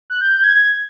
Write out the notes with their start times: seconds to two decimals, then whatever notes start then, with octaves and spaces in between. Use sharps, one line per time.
0.10 F#6
0.21 G6
0.32 G6
0.44 G#6